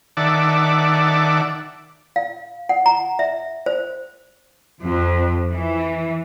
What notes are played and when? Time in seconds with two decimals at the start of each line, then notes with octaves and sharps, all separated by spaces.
0.17 D#3 D5 E5 F#5 A5 D6
2.16 F5
2.69 F#5
2.86 A#5
3.19 E5
3.66 C5
4.82 F2
5.49 E3